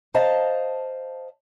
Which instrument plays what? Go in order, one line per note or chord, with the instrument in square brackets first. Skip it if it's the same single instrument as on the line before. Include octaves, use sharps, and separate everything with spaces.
[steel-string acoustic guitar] C5 D#5 F5 A5 A#5